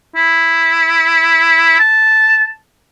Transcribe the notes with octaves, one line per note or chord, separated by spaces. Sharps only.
E4
A5